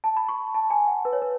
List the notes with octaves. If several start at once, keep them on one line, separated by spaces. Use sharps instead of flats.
A5
B5
C#6
A5
G#5
F#5
B4
C#5
B4